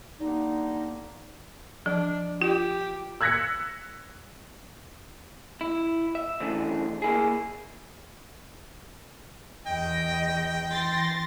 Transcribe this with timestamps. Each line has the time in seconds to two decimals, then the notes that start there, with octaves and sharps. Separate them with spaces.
0.20 D3 G3 A#3 B3 D#4
1.86 F3 D4
2.42 F4 G4
3.21 E6 F#6 G#6 A#6 B6 C#7
5.61 E4
6.15 E5
6.40 C#3 E3 A3 D4
7.02 A#3 E4 G#4
9.67 E2 D#5 G5
10.72 E3 C6 A6 A#6